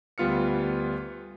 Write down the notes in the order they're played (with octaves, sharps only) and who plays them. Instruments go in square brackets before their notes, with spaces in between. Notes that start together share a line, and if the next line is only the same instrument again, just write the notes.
[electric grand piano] D2 G3 B3 F4 F6 C#7